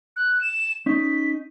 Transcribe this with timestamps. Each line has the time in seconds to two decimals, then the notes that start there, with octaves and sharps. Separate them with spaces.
0.16 F#6
0.41 E7
0.86 C#4 D#4 B6